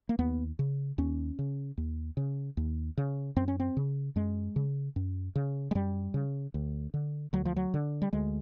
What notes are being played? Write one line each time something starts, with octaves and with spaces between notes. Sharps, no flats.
A#3
D#2 B3
C#3
D#2 C#4
C#3
D#2
C#3
D#2
C#3
F#2 C4
C#4
C4
C#3
F#2 G#3
C#3
F#2
C#3
G#3
F#2 G3
C#3
D2
D3
D2 F#3
F3
F#3
D3
G3
D2 G#3